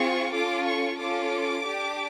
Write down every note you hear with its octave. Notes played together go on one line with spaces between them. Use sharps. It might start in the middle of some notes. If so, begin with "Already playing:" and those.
Already playing: C4 F4 G#4 C#6
C#4 F4 A4 D6
C#6
C#4 F4 A4 D6
D4 G4